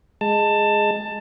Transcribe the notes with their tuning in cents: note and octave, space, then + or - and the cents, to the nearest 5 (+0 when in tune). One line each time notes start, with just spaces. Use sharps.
G#3 +0 A5 +15